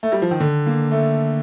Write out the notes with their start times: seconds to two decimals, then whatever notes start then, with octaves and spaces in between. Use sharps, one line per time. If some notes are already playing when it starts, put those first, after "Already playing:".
0.03 A3
0.12 G3
0.22 F3
0.31 D#3
0.40 D3
0.66 A#3
0.91 A3